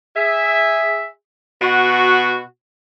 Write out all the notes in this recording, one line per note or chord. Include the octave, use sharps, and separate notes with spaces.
G#4 E5
B2 F#4